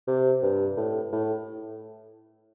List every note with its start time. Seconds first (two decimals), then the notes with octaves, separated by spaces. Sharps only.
0.07 C3
0.42 G2
0.77 A2
1.12 A2